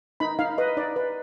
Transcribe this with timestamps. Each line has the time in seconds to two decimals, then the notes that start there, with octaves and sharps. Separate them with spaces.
0.20 D#4 B5
0.39 D#4 F5
0.58 B4 D#5
0.77 D#4 D5
0.96 B4